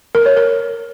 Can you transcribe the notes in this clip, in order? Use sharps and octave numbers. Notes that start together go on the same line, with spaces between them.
A#4
C#5
A#4